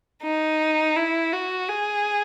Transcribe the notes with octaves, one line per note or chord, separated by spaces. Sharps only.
D#4
E4
F#4
G#4